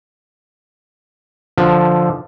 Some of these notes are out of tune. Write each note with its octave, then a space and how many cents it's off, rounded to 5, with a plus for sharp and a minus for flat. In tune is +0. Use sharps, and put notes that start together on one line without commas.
D3 +0 F3 +5